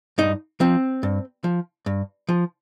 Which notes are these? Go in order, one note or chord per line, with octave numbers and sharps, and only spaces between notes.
G2 D#4
F3 C4
G2
F3
G2
F3